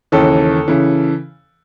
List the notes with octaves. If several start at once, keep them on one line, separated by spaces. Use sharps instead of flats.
D#2 C#3 E3 A4
C#3 E3